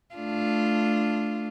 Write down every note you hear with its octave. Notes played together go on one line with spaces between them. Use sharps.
A3 D4 F4